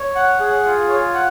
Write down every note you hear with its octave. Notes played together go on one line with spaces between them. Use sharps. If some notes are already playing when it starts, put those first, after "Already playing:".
Already playing: C#5
F#5
G#4
F4
C#5
F#5